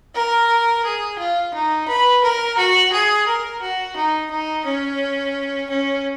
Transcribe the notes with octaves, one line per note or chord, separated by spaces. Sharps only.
A#4
G#4
F4
D#4
B4
A#4
F#4
G#4
A#4
F#4
D#4
D#4
C#4
C#4